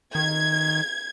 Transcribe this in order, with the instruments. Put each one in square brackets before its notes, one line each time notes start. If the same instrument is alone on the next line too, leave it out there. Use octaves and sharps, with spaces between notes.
[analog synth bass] D#3 [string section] G#6